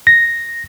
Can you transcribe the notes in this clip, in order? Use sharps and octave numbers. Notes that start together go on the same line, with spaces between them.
A#6